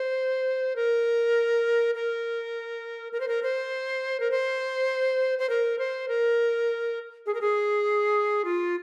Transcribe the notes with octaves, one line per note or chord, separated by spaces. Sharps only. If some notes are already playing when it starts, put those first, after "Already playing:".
Already playing: C5
A#4
A#4
A#4
C5
A#4
C5
A#4
C5
C5
A#4
C5
A#4
G#4
A#4
G#4
F4